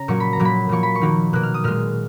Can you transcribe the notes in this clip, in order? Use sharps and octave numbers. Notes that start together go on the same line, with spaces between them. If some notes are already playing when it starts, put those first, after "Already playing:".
Already playing: C#3 A#5
A#2 F#3 A#3 C#6
B5
A#5
A#2 F#3 A#3
B5
A#2 F3 A#3 C#6
B5
C#6
D#3 F#3 A#3
B2 A#3 F#6
F6
D#6
A#2 G#3 F6